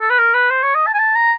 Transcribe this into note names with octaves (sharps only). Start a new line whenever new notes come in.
A4
B4
A#4
B4
C5
C#5
D#5
A5
G#5
A5
A#5